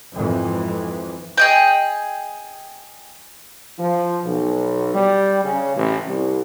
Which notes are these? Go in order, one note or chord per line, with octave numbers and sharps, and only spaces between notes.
F2 G#2 E3
G#4 D#5 G5
F3
B1
G3
C#3
A1
C2